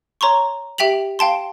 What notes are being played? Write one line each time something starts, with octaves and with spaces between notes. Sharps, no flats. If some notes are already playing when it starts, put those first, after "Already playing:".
C#5 A#5 C6 C#6
G4 E5 G5 B6 F7 F#7
F5 G5 A5 C6